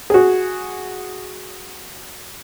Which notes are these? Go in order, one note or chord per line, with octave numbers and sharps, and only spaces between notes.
F#4 G#4